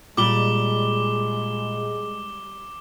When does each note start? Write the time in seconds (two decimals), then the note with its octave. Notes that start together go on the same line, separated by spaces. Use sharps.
0.17 A#2 G3 G#3 D6 G7